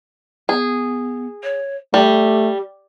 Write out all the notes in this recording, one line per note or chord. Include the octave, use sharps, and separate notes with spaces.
B3 G#4
C#5
G3 A3 G4